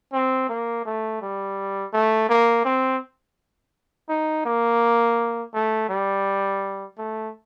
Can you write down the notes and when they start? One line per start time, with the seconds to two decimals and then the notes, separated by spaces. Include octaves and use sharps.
0.13 C4
0.49 A#3
0.85 A3
1.21 G3
1.93 A3
2.29 A#3
2.65 C4
4.09 D#4
4.46 A#3
5.54 A3
5.89 G3
6.98 A3